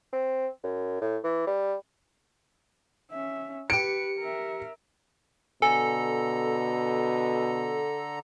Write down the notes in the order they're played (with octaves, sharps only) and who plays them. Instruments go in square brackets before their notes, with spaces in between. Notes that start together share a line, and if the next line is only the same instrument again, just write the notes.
[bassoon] C4
F#2
A2
E3
G3
[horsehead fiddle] C#4 E5
[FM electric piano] G4 C#7 [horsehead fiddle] B4 [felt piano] D7
[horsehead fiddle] A#4 E5
[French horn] B2 [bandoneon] D3 A#5 [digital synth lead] A4 [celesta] G#5